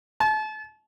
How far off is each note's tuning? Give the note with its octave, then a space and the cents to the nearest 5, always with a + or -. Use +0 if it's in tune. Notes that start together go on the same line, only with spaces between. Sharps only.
A5 -35